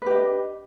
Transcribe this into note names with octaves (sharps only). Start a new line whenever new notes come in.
D4 G4 B4 D#5